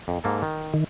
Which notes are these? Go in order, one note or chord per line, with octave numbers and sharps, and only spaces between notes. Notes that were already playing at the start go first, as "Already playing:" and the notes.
F2
G#2 A#3 A4
D#3
D#3